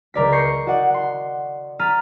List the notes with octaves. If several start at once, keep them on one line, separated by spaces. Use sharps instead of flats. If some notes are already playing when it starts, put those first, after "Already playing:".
C#2 A#4 D5 B6
C#6 G6 A#6 C7 C#7
F#4 D5 D#5 F#5
F#5 C6
A#5 F6 A6 B6 D#7